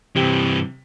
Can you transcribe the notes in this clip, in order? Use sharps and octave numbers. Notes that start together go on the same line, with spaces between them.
G2 C3 E3 G4